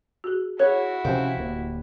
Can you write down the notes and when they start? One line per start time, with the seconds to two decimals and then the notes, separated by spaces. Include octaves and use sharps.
0.24 F#4 G#4
0.60 E4 F#4 G#4 C#5
1.05 C3 F3 C#4 G4 C5
1.37 D1 A#3